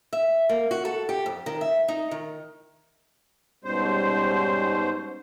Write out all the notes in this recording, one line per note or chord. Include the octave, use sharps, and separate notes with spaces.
E5
A#3
F#4
A4
G4
F2
D#3
E5
D#4
D#3
G#2 B2 G3 B3 C#4 C5